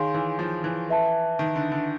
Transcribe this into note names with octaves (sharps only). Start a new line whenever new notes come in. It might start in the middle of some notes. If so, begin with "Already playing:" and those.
Already playing: D#3 G#4 C#5 F5 G#5 C6
E3
F3
E3
B4 E5 A5
D#3
D3
D3